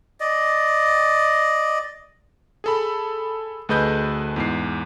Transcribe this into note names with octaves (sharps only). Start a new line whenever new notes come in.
D5 D#5
G#4 A4 B5
D2 A3 G#4 B4 D#5 G6
E2 G#2 C7